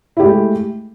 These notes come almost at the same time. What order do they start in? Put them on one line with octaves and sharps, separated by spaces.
E4 G4 G#3 A3